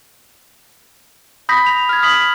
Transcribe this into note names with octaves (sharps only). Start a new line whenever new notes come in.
B5 D#6 G6 A#6 B6
F7
F6 G#6
D#6 B6 F#7